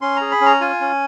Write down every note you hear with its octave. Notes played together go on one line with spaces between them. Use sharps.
C#4 C6
G#4 A#5
B5
C#4
A#5
F4 G#5
C#4